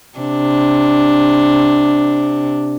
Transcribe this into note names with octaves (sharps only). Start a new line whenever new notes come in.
C3 D4